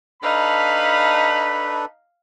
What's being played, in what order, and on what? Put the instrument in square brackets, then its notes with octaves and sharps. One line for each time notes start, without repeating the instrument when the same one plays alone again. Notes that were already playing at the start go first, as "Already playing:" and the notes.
[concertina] D4 A4 B4 [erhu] D#4 [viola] F5 [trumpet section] B5